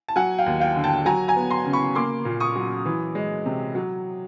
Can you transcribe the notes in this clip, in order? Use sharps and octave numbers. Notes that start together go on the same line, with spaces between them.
A5
F#3 F#5 G#5
F5 G5
D#2
F5 G5
D3
G5 A5
F#3 G#5 A#5
G#5 A#5
B3
A#5 C6
C#3
B5 C#6
A#3 C6 D6
A#2
C#6 D#6
F#3
E3
G#3
C3
F#3